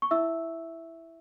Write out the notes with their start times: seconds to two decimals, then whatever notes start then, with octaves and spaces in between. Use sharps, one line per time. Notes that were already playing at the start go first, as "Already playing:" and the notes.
0.02 C#6
0.11 E4 E5 E6